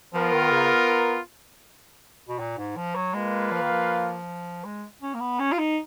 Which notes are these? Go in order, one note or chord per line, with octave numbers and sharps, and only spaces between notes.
F3 B3 F4 A#4
D#3
C#3
B2
A#2
G#2
F3
F#3
G#3 A#3 F4 B4 F5
F3
D#3
F3
G#3
C#4
A#3
B3
C#4
F4
D#4